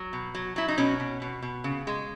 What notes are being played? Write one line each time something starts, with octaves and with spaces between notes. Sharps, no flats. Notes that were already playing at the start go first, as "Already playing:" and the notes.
Already playing: F#3
B2
F#3
F#3 E4
D#4
B2 C#4
B2
B2
B2
C#3
G#3